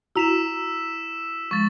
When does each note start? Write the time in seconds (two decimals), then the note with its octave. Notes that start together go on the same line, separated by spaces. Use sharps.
0.16 E4 F#4 A#5 E6 B6 E7 F7
1.51 F3 G#3 C#6 A6